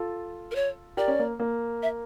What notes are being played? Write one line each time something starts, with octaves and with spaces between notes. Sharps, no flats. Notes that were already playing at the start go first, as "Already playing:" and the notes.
Already playing: F4 A4
A#4
C#5
G4 A#4 D5
C#4
A#3
A#3
E5